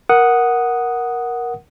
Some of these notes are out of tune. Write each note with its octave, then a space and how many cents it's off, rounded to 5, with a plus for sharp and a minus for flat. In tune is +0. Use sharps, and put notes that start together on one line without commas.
A#4 +15 F#5 +0 D#6 +0